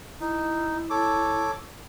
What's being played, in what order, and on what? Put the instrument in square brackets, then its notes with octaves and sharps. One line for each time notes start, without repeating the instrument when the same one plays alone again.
[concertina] D#4 [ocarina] E4
[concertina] A4 C#5 D6